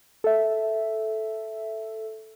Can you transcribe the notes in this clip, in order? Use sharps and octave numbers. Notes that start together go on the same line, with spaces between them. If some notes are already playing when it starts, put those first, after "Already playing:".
A4 E5